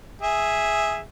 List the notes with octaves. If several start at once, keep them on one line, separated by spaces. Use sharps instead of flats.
G#4 E5